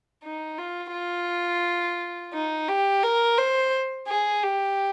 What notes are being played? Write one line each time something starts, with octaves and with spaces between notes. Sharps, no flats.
D#4
F4
F4
D#4
G4
A#4
C5
G#4
G4